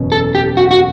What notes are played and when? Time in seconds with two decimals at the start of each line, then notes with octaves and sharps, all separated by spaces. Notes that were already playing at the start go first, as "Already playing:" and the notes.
Already playing: F#1 E2 B2 F#3 C#4
0.12 A4
0.35 G4
0.57 F#4
0.71 F#4